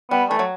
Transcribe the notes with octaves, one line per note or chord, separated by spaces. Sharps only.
G3 B3
E3 A3
F#3